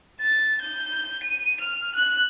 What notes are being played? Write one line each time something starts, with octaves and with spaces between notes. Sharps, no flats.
A6
G6
D#7
F6
F#6